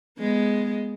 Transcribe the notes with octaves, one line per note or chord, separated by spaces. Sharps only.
G#3 B3